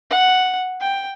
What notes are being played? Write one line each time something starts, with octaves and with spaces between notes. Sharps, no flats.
F#5
G5